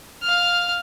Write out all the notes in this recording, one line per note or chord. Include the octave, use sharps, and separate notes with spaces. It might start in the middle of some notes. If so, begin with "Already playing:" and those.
F5 F6